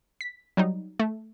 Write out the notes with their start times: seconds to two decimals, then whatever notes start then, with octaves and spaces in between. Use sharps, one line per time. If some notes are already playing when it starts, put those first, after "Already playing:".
0.21 B6
0.57 F#3 G3 D#4
1.00 A3